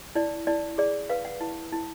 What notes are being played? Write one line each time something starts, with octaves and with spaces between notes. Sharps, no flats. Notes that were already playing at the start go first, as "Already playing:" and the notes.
E4 D5
E4 D5
G#4 D5
B4 F5
F#5
E4
E4